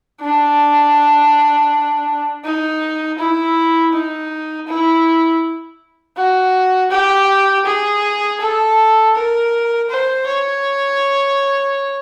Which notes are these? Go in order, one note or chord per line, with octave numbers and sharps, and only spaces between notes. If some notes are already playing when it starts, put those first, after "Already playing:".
D4
D#4
E4
D#4
E4
F#4
G4
G#4
A4
A#4
C5
C#5